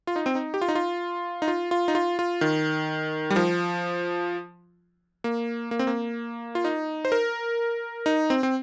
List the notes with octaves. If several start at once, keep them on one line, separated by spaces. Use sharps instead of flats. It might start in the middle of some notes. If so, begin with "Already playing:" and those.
F4
D#4
C4
D#4
G4
F4
D#4
F4
D#4
F4
F4
D#4
F4
F4
D#3
G3
F3
A#3
A#3
C4
A#3
F4
D#4
C5
A#4
D#4
C4
C4